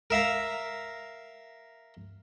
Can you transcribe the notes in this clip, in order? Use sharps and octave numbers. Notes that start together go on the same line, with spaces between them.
A#4 E5 F5 A#5